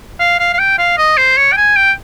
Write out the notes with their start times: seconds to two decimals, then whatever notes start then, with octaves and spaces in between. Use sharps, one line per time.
0.20 F5
0.39 F5
0.54 F5
0.59 G5
0.78 F5
0.98 D#5
1.17 C5
1.37 C#5
1.52 G5
1.57 G#5
1.76 G5